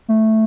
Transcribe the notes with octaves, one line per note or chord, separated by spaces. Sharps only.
A3